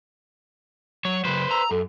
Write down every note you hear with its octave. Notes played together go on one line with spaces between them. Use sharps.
F#3 C#5
C#3 F#3 B4 C5
A#5 E6
F#2 A4